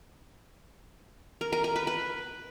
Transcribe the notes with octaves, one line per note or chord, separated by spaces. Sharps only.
A#4
A#4
A#4
B4
B4